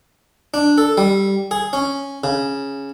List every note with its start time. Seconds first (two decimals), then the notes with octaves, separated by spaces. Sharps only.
0.54 D4
0.78 A4
0.97 G3
1.51 G#4
1.73 C#4
2.24 C#3